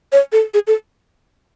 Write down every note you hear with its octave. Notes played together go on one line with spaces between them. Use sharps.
C#5
A4
G#4
A4